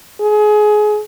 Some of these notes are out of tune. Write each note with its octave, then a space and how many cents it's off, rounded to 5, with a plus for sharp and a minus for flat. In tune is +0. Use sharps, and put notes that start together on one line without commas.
G#4 +25